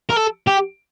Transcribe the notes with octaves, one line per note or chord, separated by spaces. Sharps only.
A#4
A4
G4